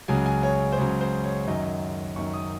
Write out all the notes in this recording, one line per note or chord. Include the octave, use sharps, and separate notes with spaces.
C#2 C#3 F#3 G#5
G#5
C#5
C5
C#2 C#3 F#3 C#5
C5
C#5
F#2 D#3 F#3 D#5
F#2 D#3 F#3 C#6
D#6